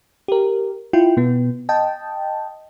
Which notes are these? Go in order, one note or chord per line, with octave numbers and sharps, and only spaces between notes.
G4 A#4
E4 F4 G5
B2 B3
D#5 G5 A5